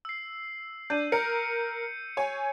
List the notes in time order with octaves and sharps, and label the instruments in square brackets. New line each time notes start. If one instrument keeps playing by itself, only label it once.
[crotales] E6 C7
[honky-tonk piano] D4 [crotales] G6 D#7
[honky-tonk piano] A#4 [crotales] C#7
[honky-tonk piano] C#5 G#5